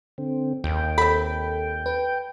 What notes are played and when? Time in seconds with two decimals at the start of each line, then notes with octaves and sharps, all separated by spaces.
0.18 D3 C4
0.64 D#2 G5
0.98 C4 A4 B5
1.86 B4